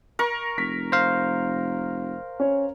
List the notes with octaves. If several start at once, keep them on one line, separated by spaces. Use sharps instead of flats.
A#4 C#6
F1 B6
C5 F5
C#4 C#5